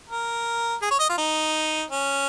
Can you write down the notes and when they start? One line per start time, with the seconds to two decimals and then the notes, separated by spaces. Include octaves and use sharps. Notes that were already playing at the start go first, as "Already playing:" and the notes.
0.09 A#4
0.82 G#4
0.91 C#5
1.00 D#5
1.09 F4
1.18 D#4
1.91 C#4